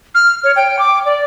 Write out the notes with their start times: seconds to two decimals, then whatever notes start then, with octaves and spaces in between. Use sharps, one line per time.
0.15 F6
0.44 C#5
0.56 G5
0.79 D6
1.05 D5